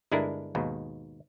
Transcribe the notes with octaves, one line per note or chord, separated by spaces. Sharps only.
G1 G#3 D4 E4 A#4
D#2 G#2 B2